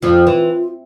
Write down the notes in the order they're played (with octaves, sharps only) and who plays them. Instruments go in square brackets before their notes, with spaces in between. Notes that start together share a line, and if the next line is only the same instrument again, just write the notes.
[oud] F2 F3 [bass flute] F4
[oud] E3